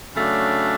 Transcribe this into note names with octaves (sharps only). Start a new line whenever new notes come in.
C#3 F#3 A3 D4